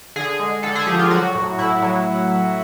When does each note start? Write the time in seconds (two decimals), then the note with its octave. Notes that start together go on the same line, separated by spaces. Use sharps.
0.16 D3 G#4
0.39 G#3
0.63 D3 A4
0.75 G#4
0.87 F3 G4
0.99 F4
1.11 F#3 F#4
1.35 A2
1.59 A2 E4
1.82 F#3